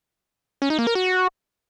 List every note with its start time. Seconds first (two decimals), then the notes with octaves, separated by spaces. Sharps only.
0.62 C#4
0.70 D#4
0.79 A#3
0.87 A#4
0.95 F#4